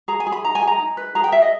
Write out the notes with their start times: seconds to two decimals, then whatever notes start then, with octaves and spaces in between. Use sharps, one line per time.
0.08 G#4 A#5
0.20 G#5
0.27 G#4
0.32 B5
0.44 D#4 A#5
0.55 G#5
0.62 G#4
0.67 A#5
0.79 D#4
0.97 B4
1.15 G#4 A#5
1.24 G5
1.32 G#4 E5
1.42 D#5